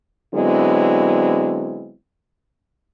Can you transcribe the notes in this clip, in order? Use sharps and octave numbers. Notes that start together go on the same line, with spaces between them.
D3 F#3 G#3 B3 C4 E4